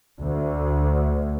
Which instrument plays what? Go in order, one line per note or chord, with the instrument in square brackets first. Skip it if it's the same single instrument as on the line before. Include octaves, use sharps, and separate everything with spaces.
[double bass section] D2